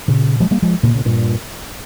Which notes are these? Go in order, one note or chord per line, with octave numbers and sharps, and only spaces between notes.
A#2 C#3
F3 G#3
G3 A#3
F3 G#3
A#2 C#3
A#2 C#3
G2 A#2